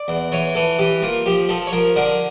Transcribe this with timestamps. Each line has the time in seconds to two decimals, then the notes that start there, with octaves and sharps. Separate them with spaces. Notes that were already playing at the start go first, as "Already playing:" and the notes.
Already playing: D5
0.08 E2
0.32 E3 C#5
0.55 E3 A4
0.79 E3 G4
1.02 A#3 F4
1.26 F3 G4
1.49 F3 A4
1.67 C#5
1.72 F3 A#4
1.96 D3 A#4